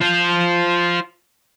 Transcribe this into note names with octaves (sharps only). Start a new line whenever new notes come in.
F4 C5